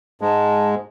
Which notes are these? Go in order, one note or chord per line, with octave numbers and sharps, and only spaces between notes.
G#2 G#3 A5